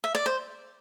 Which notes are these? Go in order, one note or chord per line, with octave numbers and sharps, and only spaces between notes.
E5
D5
C5